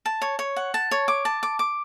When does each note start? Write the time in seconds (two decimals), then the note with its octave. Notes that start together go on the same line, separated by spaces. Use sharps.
0.06 A5
0.22 C#5
0.39 C#5
0.56 F#5
0.74 A5
0.91 C#5
1.08 D6
1.25 A5
1.43 D6
1.59 D6